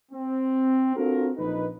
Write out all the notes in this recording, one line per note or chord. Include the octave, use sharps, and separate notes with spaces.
C4
C4 D4 F4 F#4 A4 A#4
A#1 D#4 B4